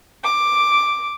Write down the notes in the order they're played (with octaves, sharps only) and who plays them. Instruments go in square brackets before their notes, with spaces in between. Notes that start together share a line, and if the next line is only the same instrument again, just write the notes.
[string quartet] D6